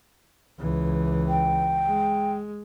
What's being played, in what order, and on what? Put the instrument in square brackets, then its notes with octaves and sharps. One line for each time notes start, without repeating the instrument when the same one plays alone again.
[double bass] C#2 E3
[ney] G5
[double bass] G#3